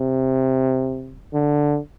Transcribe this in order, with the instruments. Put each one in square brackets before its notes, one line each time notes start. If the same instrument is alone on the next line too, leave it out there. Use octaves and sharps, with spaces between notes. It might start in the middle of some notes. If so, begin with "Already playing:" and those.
Already playing: [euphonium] C3
D3